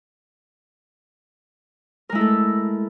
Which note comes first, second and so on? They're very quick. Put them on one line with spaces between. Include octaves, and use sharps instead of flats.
A#4 G#3 E4 A3 A4